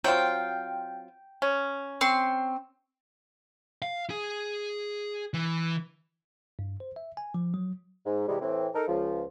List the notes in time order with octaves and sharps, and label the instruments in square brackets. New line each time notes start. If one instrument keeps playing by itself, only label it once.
[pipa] F#3 C4 F4 [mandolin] G5
[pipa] C#4
[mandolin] C4 C6 C#6
[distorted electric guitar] F5
G#4
E3
[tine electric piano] G2
C5
E5
G#5
F3
F#3
[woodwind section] G#2
C3 E3 G3 G#3
A2 E3 C4
D#4 A4 A#4
C#2 F3